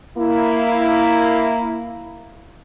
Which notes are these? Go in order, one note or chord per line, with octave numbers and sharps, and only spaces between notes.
A#3 E4